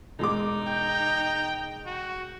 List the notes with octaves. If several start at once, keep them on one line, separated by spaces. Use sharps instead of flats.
E1 G#3 D#4 D6
G5
F#4